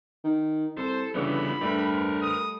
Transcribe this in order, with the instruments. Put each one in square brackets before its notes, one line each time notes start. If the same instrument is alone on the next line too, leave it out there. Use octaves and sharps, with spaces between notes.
[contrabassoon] D#3
[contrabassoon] C2 [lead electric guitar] A4 [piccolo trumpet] C5
[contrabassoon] G1 [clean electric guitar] G2 C#3 E3 [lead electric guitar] B3 D4 [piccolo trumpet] B5
[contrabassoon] G2 [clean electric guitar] G3 A3 [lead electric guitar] A#4 B4
[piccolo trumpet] D#6